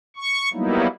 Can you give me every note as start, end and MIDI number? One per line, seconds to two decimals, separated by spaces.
0.16 0.49 85
0.53 0.87 54
0.53 0.87 55
0.53 0.87 58
0.53 0.87 59
0.53 0.87 63
0.53 0.87 64